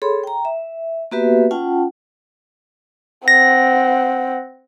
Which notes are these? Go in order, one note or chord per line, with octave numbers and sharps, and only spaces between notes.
G#4 A4 C#5 B5 C6
G5 A#5
E5
A#3 B3 F#4 G4 B4 E5
C#4 F4 F#5 G5 A5
C4 F#5 A#6